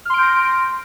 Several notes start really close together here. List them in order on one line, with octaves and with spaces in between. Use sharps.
F6 C6 D7 G6 A#6